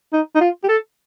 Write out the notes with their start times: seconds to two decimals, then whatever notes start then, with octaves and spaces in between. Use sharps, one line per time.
0.13 D#4
0.35 D#4
0.41 F4
0.64 G4
0.69 A4